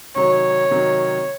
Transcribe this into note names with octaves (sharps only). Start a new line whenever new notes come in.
C3 D#3 F#3 C#5
C3 D#3 F#3